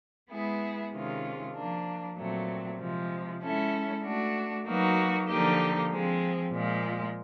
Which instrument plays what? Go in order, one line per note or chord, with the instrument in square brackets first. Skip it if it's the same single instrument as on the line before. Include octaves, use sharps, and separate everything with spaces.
[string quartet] G#3 B3 E4 G#4
C3 D#3 G#3 C#4 F4
F3 A#3 D4
A#2 F#3 A3 C4
C3 F3 G#3
G#3 C#4 E4 A4
A3 D4 F#4
F#3 A#3 D#4 F#4 B4
D3 F3 A#3 D#4 G4
F3 G#3 C4
A#2 F3 G#3